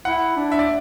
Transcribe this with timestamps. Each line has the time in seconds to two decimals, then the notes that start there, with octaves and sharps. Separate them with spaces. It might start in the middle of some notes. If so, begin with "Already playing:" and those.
0.05 E4 F#5
0.37 D4
0.52 E5
0.59 D5